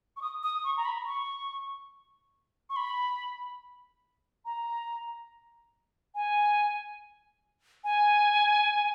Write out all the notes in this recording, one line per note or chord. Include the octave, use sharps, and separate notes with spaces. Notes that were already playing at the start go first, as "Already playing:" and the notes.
C#6
D#6
D#6
C#6
A#5
B5
C#6
C#6
B5
A#5
G#5
G#5